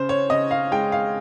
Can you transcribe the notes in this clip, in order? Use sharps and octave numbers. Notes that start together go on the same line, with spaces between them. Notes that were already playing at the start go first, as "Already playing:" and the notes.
Already playing: C#3 C5
C#5
C#3 D#5
F5
G#3 G5
F5